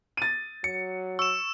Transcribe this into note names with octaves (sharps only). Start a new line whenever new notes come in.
A6 D#7
F#3 C#7
C#6 E6 E7